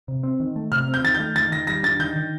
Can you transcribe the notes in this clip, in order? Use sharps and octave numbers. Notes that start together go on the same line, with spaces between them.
C3
C4
D#3
A3
C3 F6
C4
G6
D#3 A6
G6
A3
D#3 A6
D#3 A#6
G3 A#6
D4 A6
D#3 G6
D#3